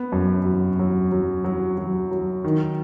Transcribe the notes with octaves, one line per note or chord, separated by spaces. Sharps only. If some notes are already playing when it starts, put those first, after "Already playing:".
Already playing: B3
F#2
F#3
F#3
F#3
F#3
F#3
F#3
D#3